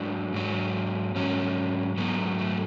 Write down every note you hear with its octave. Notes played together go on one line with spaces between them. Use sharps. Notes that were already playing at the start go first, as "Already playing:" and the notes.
Already playing: G#2 F#3 D4
G#2 F#3
G#2 F#3 C#4
G#2 F#3 B3
A3
A3